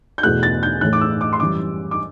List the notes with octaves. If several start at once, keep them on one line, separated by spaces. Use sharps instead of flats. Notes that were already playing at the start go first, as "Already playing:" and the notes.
G6
E2 B2 A3 F#6
A6
G6
A2 E3 A3 F#6
D6
E6
D6
C6
F#2 E3 G3 D6
D6